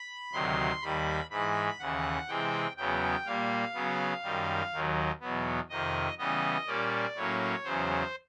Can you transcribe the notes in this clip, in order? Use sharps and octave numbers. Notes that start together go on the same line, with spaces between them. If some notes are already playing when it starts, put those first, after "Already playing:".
Already playing: B5
D2 C3 D#3 F#3 C6
D#2 D#3 G3 B5
G#2 E3 G#3 B5
D#2 C#3 E3 F#5
C3 E3 G#3 C4 G5
E2 C#3 F#3 B3 G5
A#2 G3 A#3 F5
C#3 F#3 B3
F#2 D#3 G3
D#2 D#3 F#3
E2 B2 F#3 B3
F2 C3 D#3 D#5
C#3 E3 G3 B3 D#5
A#2 G3 A#3 C#4 D5
A2 F#3 A#3 C#4 C#5
E2 C#3 F#3 C5